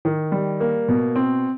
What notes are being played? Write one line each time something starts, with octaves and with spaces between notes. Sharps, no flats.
D#3
G3
A#3
B2
C4